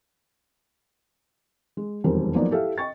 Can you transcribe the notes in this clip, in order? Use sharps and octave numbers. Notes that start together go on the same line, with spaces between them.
G#3
E1 F2 D#3 G3 A#4 C5
F3 F#3 A#3 B3 D#4 D5
E4 G4 A4 E5 F5
D#5 G5 C#6 A6